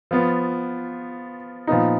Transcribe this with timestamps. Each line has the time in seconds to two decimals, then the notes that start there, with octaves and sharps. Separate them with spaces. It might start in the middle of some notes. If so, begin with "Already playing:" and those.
0.11 F3 B3 F4
1.67 A#2 F3 B3 D#4